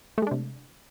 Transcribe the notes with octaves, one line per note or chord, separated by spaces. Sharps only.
C3 G#3 A3 D4